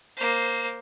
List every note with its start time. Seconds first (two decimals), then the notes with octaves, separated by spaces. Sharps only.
0.17 A#3 C5